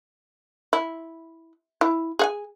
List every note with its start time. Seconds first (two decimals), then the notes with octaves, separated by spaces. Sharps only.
0.73 E4
1.81 E4
2.19 G#4 F#5 G#5